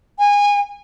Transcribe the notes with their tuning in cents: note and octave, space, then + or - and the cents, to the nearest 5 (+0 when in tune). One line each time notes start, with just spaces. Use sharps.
G#5 -25